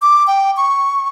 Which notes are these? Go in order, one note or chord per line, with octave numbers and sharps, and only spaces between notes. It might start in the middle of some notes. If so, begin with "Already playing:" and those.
D6
G5
C#6